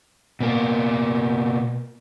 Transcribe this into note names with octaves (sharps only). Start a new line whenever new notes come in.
B2 A#3